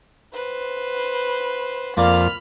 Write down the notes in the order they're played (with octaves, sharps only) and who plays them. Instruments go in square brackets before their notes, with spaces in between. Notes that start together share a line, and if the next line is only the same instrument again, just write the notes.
[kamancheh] B4 C5
[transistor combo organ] F2 [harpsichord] A#3 D5 [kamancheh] B5 F6